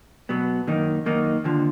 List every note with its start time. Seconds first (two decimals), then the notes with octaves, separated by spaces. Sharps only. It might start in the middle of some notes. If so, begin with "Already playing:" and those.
0.29 B2 F#3 B3
0.67 F#2 D#3 A#3 D#4
1.06 F#2 D#3 A#3 D#4
1.44 D#2 D3 F3